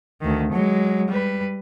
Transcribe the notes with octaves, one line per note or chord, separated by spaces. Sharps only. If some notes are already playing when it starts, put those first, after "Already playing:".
D2 D#3
F#3 G#3
G3 B4